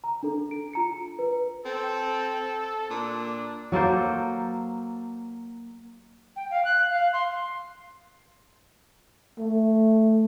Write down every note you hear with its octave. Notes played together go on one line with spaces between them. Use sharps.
A#5
D4 A4
D7
F4 A#5 C#7
B4
C4 A4
A#2 D4
F#3 A#3 A4 C5
G5
F5
F#6
F5
C6
A3